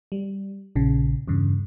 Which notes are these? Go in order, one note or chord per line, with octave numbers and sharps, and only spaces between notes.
G3
A#1 C#3
E2 G2 C#3